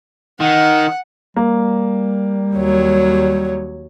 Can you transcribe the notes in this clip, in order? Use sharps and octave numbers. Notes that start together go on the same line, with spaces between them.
D#3 F#5
G3 A#3
D#2 F#3 C#5